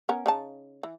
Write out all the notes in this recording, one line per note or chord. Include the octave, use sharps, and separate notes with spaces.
B3 C#4 A#4
C#3 D#4 A5
E3